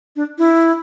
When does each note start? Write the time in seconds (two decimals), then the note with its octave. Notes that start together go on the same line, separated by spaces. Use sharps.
0.16 D4
0.38 E4